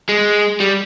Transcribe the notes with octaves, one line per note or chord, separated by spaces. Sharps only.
G#3
G3